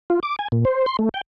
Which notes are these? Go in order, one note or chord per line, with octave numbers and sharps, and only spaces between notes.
F4
D6
G#5
A#2
C5
C6
A3
G5